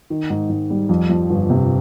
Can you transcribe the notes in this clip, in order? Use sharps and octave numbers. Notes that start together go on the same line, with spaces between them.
D#3
G#2
G#2
G3
F2
F3
G1
C3